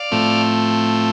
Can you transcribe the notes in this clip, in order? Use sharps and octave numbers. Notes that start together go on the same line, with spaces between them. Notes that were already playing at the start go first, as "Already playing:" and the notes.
Already playing: D5 F5
A2 F3 A3 C4